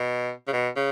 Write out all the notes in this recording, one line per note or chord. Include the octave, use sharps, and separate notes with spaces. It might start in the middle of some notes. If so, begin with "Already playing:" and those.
Already playing: B2
C#3
B2
C#3